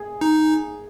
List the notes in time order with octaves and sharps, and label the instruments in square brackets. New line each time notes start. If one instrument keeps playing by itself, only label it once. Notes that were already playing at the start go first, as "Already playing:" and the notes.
Already playing: [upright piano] G#4
[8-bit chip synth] D#4